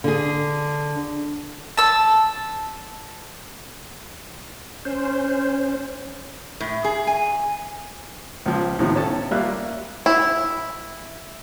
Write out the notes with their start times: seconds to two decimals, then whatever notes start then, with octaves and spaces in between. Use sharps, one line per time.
0.04 D3 G#4
1.77 A5 E6
4.85 C#4 C5
6.60 A2
6.84 G#4
7.07 G#5
8.46 C#2 F3
8.79 A2 C3 D#3 F3
8.96 C#4 A4 A5
9.31 G3 A#3 F4 E5 F#6
10.06 E4